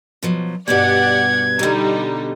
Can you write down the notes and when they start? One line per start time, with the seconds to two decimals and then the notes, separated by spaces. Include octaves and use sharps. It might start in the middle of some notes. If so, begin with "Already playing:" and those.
0.23 B2 F3 F#3
0.68 G2 B2 B3 G4 D5 F#5 G#6
1.59 B2 D3 G3 D#4